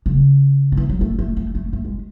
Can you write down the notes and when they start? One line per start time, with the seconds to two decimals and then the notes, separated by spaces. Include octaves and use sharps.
0.06 C#3
0.72 F#3
0.77 E3
0.89 F#3
1.01 A3
1.19 A3
1.37 A3
1.55 A3
1.73 A3
1.85 G#3